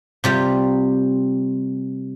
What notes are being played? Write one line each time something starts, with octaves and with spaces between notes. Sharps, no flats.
C3 G3 F4